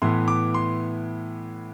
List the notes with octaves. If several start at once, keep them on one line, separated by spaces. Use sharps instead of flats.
A2 E3 B3 C6
D6
C6